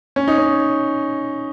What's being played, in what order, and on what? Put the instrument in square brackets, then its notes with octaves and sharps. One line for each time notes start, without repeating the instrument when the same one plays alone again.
[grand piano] C#4
D#4
C#4